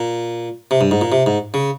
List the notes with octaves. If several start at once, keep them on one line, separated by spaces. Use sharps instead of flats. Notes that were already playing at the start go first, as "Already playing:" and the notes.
Already playing: A#2
C3
G2
G#2
A#2
C3
G#2
C#3